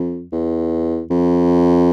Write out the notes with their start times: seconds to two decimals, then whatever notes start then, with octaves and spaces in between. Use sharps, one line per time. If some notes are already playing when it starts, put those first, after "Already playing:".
Already playing: F2
0.33 E2
1.11 F2